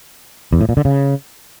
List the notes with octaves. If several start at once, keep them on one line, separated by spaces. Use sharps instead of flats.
E2
A2
A#2
D3
C#3